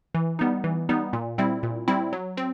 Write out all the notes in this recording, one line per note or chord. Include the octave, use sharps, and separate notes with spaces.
E3
G3 B3 D#4
E3
G3 B3 D#4
A#2
G3 C4 E4
A#2
G3 C4 E4
F#3
C4